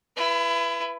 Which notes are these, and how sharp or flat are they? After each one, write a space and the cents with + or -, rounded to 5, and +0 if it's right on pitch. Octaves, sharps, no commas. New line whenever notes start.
E4 +30 B4 -5